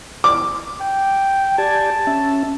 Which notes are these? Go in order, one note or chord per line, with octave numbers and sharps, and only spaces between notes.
D6
G5
G4 D5 G#5 A5
C#4 E5